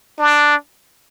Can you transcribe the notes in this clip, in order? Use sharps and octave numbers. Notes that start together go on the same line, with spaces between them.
D4